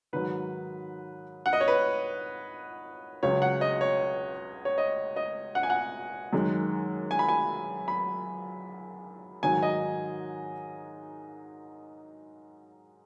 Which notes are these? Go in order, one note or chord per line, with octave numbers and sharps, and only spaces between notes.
G#2 D#3 F#3 B4
F#5
D#5
C#5
B4
C#2 C#3 F#3 C#5
F#5
D#5
C#5
C#5
D#5
D#5
F#5
G#5
F#5
F#2 D#3 G#3
G#5
B5
G#5
B5
G#2 D#3 F#3 G#5
D#5